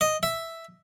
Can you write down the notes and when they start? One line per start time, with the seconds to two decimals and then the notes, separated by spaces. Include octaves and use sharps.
0.01 D#5
0.23 E5